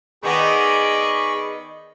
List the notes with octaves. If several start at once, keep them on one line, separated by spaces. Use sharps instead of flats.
D#3 B3 G#4 D5 D#5 B5 C#6